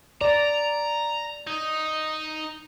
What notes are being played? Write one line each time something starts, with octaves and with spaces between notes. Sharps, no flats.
D5 A#5
D#4